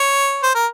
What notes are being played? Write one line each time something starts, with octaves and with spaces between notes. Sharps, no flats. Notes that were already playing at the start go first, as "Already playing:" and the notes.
Already playing: C#5
C5
A#4